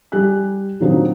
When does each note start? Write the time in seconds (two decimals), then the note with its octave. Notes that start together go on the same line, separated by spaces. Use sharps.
0.12 G3 G4 G#5 F#6
0.80 A#2 D#3 F#3 C4 D4 D#4